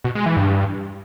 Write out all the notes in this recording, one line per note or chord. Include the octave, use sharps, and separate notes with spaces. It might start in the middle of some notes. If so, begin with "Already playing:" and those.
B2
G#3
E3
G2